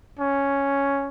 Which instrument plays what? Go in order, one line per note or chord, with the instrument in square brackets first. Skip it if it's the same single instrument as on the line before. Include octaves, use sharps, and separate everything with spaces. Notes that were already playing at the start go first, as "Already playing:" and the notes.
[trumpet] C#4